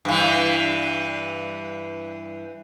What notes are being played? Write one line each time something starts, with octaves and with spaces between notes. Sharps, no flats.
G2 E3